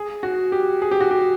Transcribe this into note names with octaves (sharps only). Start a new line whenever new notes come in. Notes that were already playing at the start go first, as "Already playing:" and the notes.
Already playing: G#4
F#4
G4
G#4
G4
F#4
G4